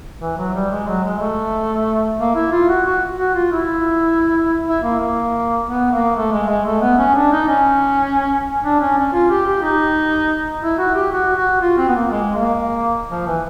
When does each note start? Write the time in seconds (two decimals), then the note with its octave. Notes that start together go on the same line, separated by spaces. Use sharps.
0.20 E3
0.37 F#3
0.54 G3
0.70 G#3
0.87 F#3
1.04 G#3
1.20 A3
2.18 A#3
2.35 E4
2.51 F4
2.69 F#4
2.85 F#4
3.18 F#4
3.34 F4
3.52 E4
4.67 E4
4.83 A#3
4.99 A#3
5.66 B3
5.91 A#3
6.16 A3
6.32 G#3
6.48 G#3
6.65 A3
6.81 B3
6.98 C#4
7.15 D4
7.32 D#4
7.48 C#4
8.64 D4
8.80 C#4
8.97 C#4
9.13 F4
9.30 G4
9.47 G4
9.62 D#4
10.62 E4
10.79 F#4
10.95 G4
11.12 F#4
11.36 F#4
11.61 F4
11.78 C4
11.88 B3
11.95 A#3
12.11 G#3
12.35 A#3
13.10 F3
13.26 E3